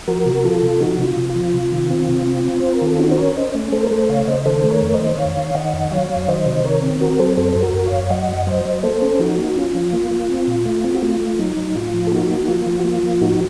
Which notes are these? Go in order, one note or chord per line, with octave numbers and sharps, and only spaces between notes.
F3 F#4 A#4
C3
F3 F4 A4
C3
F3 D#4 F#4
C3 D#4
F4
C3
F4
F3
C3
D#3
C4
C3
C4
C4
C4 C5
A#4
D#3
A4
C#4 D#4 F#4
C5
C#4 A#4 C#5
C#4 C5 D#5
A3
A3 A4 C5
A#4
A3 A4 C5
C#3 C#5 F5
C#3 C5 D#5
D#3 A4 C5
A3
A#4 C#5
F2
C5 D#5
D#3
D#3 C#5 F5
D#3
D#3 D#5 F#5
F2
F#3 C#5 F5
F#3
D#3 C5 D#5
C3
D#3 A#4 C#5
C4
C4 F#4 A#4
F#3 A4 C5
F#2 A4 C5
F#2 C5
F#4 A#4
F#2
C#5 F5
F#2
F#3 D#5 F#5
F#2
F#3 C5 D#5
F#3
A#3 A4 C5
C#4
F3 D#4 F#4
A#3
C#4 F4
F3
A#3
A#3
C4
A#2
A3
C4
F#4
A3 F4
A3
F#3 D#4
F#3
A2 F4
F3
A4
A#3 D#4 F#4
A#3
D#4
F3 F4
F3
F#4
A#3 F4
F3
A2 D#4 F#4